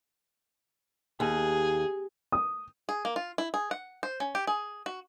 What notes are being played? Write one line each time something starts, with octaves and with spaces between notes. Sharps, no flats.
D#2 G#4
D#6
G#4
A#3
F4
E4
G#4
F#5
C5
C#4
G4
G#4
F#4